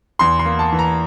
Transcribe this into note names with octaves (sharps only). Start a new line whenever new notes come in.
E2 C6
C6
A#3
A5
E3
A#5